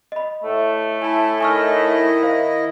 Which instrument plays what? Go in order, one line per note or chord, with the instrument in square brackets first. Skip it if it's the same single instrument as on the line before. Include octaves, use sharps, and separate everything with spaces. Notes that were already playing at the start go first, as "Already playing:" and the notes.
[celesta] D#5 B5
[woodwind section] A2 A3
[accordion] E4 [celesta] G#5 A5
[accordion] D#3 E4 D#5 [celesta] G#5 C#6 F6
[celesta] C5 F5